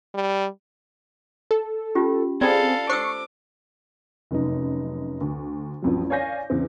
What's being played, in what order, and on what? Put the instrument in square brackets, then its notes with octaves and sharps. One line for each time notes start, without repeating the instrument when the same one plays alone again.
[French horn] G3
[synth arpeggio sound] A4
[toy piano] C#4 F4 G4
[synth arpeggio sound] C4 G#4 [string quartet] A4 F5 [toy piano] D5 B5
[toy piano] C5 E6 [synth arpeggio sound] C#6 C7 C#7 [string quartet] D6
[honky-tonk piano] F1 F#2 D#4
D2
A1 F2 F#3
C#5 D5 F5 G#5 G6 A#6
E2 C#3 C4